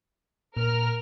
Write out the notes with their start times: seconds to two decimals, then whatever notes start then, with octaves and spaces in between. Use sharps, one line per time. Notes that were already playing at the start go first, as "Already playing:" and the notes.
0.57 A#2 A#4 F6